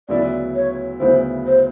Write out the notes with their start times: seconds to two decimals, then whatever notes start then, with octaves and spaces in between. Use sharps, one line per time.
0.09 D2 C#3 F#3 B3 E4 D5
0.55 C#5
1.00 D2 C#3 F#3 B3 E4 C5
1.47 C5